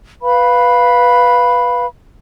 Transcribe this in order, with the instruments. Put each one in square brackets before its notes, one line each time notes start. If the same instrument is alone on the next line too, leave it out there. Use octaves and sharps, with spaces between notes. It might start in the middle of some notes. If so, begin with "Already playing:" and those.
[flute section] B4 F5 B5